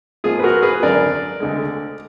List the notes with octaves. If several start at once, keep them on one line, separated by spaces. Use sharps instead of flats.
G#2 F3 A#3 F4 G#4
B4
F#4 A#4
G#4 B4
G#1 F#2 D3 A#4 D5
D2 D3 G#3